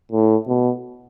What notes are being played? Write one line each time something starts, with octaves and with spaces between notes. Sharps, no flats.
A2
B2